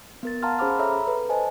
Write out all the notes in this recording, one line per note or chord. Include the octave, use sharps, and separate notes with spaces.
B3 A#4 A6
F5 F#5 A5 A#5 C6 F6
C#4 G#4 C5 B5 D6 F6
A4 C#5 E5 A#5 B5 E6
A4 B4
C5 D#5 G#5 A5